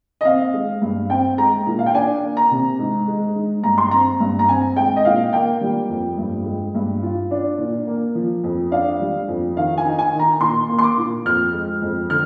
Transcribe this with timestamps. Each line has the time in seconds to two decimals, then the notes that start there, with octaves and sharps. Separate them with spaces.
0.21 D#5
0.25 C4 F5
0.54 G#3
0.82 G2
1.10 C4 G5
1.38 G#3 A#5
1.67 A#2
1.79 F5
1.86 G5
1.94 D4 G#5
2.23 A#3
2.37 A#5
2.51 C3
2.79 G#2
3.08 G#3
3.36 G#2
3.63 G2 A#5
3.78 C6
3.91 C4 A#5
4.20 G2
4.39 A#5
4.48 C4 G#5
4.76 G#3 G5
4.96 D#5
5.05 A#2 F5
5.33 A#3 G5
5.61 G3
5.90 F2
6.18 G2
6.45 G#3
6.75 G2
7.03 F4
7.31 D4
7.58 A#2
7.87 A#3
8.15 F3
8.44 F2
8.71 D4 F5
9.00 G3
9.28 F2
9.56 D#3 F5
9.78 G#5
9.85 D#4
9.99 G#5
10.13 D#3
10.19 A#5
10.41 A#2 C6
10.69 A#3
10.79 C6
10.83 D6
10.98 A#2
11.25 F2 F6
11.54 G#3
11.82 F2
12.10 D3 F6